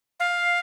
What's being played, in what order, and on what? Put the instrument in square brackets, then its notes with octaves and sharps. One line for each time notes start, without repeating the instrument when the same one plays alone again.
[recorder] F5